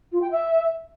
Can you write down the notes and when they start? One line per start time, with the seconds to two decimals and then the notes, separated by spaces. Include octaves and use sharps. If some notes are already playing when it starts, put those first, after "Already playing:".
0.12 F4
0.21 G5
0.31 E5